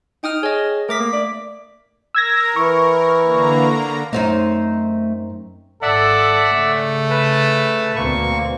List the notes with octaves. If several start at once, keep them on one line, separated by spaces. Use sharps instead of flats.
D#4 G5 D#6 F6
G#4 C#5 D#5
A3 A#4 D6 B6
A#3
D5
A#4 E6 G#6 A#6
E3 E4 C#6
D3 A#3 A#5
F#2 A3 C4 D#4
G#1 A4 D5 E5 F#5
C#3 A3
B4 A5
D2 B2 A#3 C4 C#6